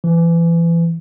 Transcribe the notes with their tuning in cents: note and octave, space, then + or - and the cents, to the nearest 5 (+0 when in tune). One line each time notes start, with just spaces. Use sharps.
E3 +30